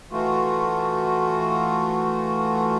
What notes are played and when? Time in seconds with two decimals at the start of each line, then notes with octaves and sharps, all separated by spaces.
0.12 E3 A3 F4 F#4